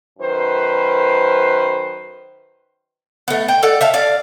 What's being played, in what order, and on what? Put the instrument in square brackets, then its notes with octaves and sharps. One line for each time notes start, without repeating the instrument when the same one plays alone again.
[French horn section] F#2 D#3 B4 C5
[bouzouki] A3 B3
G5
A4 D5 F#5
E5 F5 A5
D5 F5